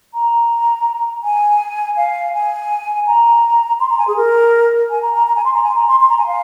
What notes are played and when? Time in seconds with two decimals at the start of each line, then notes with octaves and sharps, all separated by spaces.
0.14 A#5
1.24 G#5
1.97 F5
2.34 G#5
3.07 A#5
3.80 C6
3.89 A#5
3.98 G#5
4.08 G#4
4.17 A#4
4.90 G#5
5.02 A#5
5.14 A#5
5.27 A#5
5.36 G#5
5.45 C6
5.54 A#5
5.63 G#5
5.76 A#5
5.88 C6
6.00 C6
6.09 A#5
6.18 G#5
6.27 F5